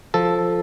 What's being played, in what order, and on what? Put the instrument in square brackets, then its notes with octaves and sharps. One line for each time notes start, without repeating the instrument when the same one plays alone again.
[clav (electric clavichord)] F3 A4